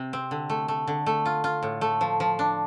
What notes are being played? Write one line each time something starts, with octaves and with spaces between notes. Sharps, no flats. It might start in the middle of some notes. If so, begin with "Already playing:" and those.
Already playing: C3
C4
D3
A3
A3
D3
A3
F4
F4
A2
A3
F3
F3
D4